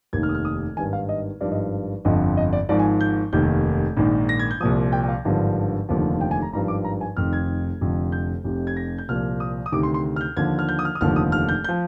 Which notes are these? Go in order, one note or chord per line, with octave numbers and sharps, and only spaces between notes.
F1 D#2 D#3 G#6
F6
D#6
F6
D#6
G#1 G2 D#3 G#5
F5
D#5
G#1 G2 F3 D5
D#5
G1 F2 D3 F3 D#5
D#5
D5
G#1 G#2 F3 D5
G#5
G6
F1 D#2 D#3 G6
A#1 G#2 D#3
A#6
G#6
G6
C2 A#2 F3 D#6
G5
G5
F5
G#1 G2 D3 F3
F1 D#2 D3 F3
G5
G#5
A#5
G#1 G2 F3 A#5
D6
A#5
G#5
F1 F2 D#3 F6
G#6
F1 F2 D3 F3
G6
F1 F2 C3
G#6
A#6
G6
C2 A#2 F3 F6
D#6
D#6
D2 C3 D#3 D6
C6
C6
F6
G6
D#2 D3 F3 G#6
F6
G6
D#6
F6
D#6
F1 D#2 D3 F3 F6
D#6
F6
G6
G6
F3